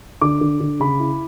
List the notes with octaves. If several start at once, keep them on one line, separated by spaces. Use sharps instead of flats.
D3 D6
D3
D3
C#3 B5
E4